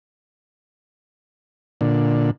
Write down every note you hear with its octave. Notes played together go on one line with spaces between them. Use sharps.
A#2 D3